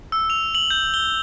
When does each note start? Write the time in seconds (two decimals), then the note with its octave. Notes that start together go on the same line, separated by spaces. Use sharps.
0.12 E6
0.30 F7
0.55 F#7
0.70 G6
0.94 G7